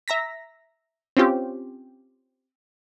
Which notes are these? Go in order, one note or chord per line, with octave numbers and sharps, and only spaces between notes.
E5 A#5 A#6 B6
C4 C#4 F4 G4